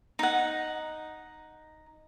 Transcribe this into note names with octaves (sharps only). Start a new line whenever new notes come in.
D#4 F#5